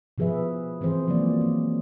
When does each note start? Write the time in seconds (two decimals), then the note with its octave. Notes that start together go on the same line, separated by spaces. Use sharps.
0.18 B2 F3 G#4 B4 E5
0.81 E3 C4 G#4 C5
1.08 F3 F#3 G#3 A#3 D5
1.41 C4